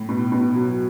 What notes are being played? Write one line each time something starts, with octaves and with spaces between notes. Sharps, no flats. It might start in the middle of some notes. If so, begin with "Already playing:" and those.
Already playing: A2
B2
B2
F#3